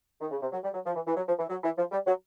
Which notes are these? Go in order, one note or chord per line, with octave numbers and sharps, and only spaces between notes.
D#3
C#3
C3
F#3
G3
F#3
F3
E3
E3
F#3
F3
E3
F#3
E3
F3
G3
F#3